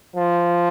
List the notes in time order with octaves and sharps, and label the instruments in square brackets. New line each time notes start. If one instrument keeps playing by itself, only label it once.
[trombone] F3